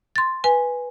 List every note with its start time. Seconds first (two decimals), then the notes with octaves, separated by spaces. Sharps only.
0.16 C6 A6
0.44 B4 G#5